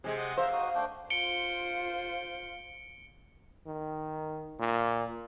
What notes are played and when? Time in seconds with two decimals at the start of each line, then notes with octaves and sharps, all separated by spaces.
0.04 C3 G#3 G#4
0.17 D#5 F#5
0.37 C5 E5 F5 A#5
0.53 D#4 F#4 D#6
0.75 A3 D4 G5
1.10 F4 C5 C#7 D7 G7
3.67 D#3
4.59 A#2